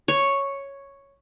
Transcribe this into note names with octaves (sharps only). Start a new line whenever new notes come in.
C#5